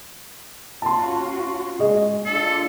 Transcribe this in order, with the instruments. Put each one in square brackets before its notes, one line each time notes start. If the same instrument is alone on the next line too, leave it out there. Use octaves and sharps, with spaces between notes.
[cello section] C#4 F4 F#4 [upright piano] A5 C6
[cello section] G#3 [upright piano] G#4 D#5
[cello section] D4 F4 [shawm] A4